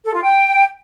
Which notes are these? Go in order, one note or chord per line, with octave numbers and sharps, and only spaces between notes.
A4
F4
G5